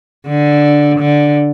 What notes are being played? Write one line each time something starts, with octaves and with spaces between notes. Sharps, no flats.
D3
D3